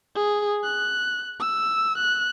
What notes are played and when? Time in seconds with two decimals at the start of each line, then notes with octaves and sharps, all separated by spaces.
0.16 G#4
0.64 F#6
1.40 E6
1.98 F#6